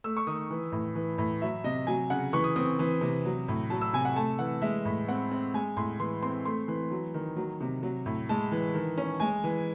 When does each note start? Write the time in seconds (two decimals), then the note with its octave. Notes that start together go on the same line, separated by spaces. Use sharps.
0.04 A3 E6
0.17 C#6
0.27 D#3 D#6
0.50 E3
0.72 A2
0.95 E3
1.18 A2
1.42 F#3 E5
1.64 C3 D#5
1.87 F#3 G#5
2.10 C#3 F#5
2.33 E3 C#6
2.44 D#6
2.56 C4 D#6
2.79 E3
3.01 C3
3.25 F#3
3.48 A2
3.70 F#3 A5
3.81 E6
3.93 C3 G#5
4.05 F#5
4.16 A3 A5
4.39 E3 F#5
4.62 G#3 E5
4.85 A2
5.08 C4 F#5
5.31 C4
5.54 G#3 G#5
5.77 A2 C6
5.99 E3 C6
6.22 C4 C6
6.45 A3 C6
6.68 E3
6.91 F#3
7.14 D#3
7.36 F#3
7.61 C3
7.83 F#3
8.06 A2
8.29 G#3 A5
8.52 E3
8.74 D#3
8.98 C#4
9.20 G#3 G#5
9.44 E3